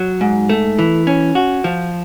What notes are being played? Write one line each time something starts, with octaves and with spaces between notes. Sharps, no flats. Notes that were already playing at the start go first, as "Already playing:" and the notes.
Already playing: F#3
G#2
A3
E3
C#4
F#4
F3